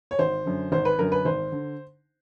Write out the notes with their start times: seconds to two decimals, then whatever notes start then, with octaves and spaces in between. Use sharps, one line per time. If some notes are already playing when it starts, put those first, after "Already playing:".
0.11 C#5
0.19 G#1 C5
0.45 F#2 D3
0.72 G#1 C5
0.85 B4
0.99 F#2 D3 A#4
1.12 B4
1.25 G#1 C5
1.52 D3